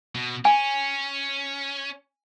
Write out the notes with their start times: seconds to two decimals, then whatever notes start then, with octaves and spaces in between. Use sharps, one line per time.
0.15 B2
0.45 C#4 G#5